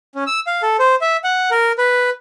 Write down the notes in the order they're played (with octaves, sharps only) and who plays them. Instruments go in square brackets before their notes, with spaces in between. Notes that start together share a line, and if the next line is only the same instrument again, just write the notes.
[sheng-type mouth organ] C#4
E6
F5
A4
C5
E5
F#5
A#4
B4